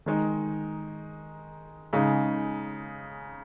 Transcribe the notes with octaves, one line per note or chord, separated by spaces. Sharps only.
D#3 G#3 D#4
C#3 G#3 D#4